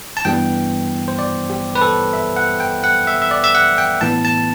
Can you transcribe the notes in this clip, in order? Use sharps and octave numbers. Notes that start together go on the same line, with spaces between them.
A5
G2 E3 G3 B3 G5
C5
D5
G4
B4
A4
E5
F#5
G5
F#5
E5
E5
D5
E5
F#5
G5
A2 E3 B3 A5
A5